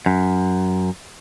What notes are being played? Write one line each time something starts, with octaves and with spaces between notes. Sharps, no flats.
F#2